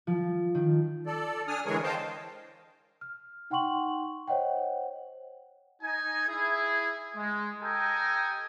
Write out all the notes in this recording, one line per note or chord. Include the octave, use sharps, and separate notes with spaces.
F3
D#3
A4 D5
D4 G#5 D#6 F6
D3 E3 G#3 G#4 A#4 C#5
C5 D#5 F5 G5 A5
F6
D#4 F#5 G5 C6 C#6 F#7
C5 C#5 D#5 F#5 G5
D#4 G#5
E4 G#4
G#3
G4 A4 D#5 G5 G#5 A#5